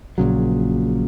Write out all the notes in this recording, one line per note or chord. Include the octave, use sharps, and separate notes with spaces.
A#1 A#2 C#3 F#3